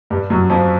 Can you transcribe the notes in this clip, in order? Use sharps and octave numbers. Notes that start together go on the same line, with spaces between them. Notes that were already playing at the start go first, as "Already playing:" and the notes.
G2 G3
F#2 F#3
F2 F3